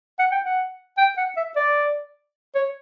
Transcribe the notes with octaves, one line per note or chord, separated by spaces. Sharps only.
F#5
G5
F#5
G5
F#5
E5
D5
C#5